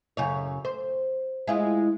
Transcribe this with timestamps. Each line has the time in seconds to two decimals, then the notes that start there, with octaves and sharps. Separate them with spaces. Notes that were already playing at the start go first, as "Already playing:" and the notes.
0.17 F#2 C#3 C#5
0.65 C5
1.47 G#3 E4 F4